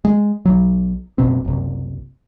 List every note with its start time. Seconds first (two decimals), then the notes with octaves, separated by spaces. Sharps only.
0.05 G#3
0.45 B1 F#3
1.18 F#1 B1 B2 C4
1.45 F#1 C2